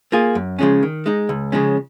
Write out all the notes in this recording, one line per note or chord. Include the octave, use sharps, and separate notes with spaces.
A#3 F4 G#4
F#2
C#3 F3 G#3 C#4
D#3
G#3 D#4
C#2
C#3 F3 G#3 C#4